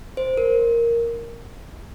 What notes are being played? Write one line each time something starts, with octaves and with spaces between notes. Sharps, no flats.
C5
A#4